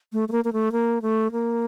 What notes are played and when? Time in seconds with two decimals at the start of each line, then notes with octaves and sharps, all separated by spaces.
0.13 A3
0.29 A3
0.32 A#3
0.45 A#3
0.53 A3
0.72 A#3
1.02 A3
1.32 A#3